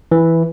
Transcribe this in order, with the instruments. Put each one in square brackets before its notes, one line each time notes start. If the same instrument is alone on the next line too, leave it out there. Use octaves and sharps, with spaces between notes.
[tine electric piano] E3